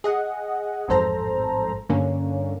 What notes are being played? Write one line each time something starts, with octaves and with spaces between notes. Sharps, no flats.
G#4 D#5 F#5
A1 F2 G#2 A4 C5 A#5
G2 D3 A#3 C#4